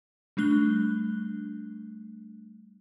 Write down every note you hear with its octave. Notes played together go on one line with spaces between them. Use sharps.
G3 A3 D4 F#6 G7